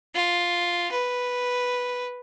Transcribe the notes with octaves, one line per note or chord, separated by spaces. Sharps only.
F4
B4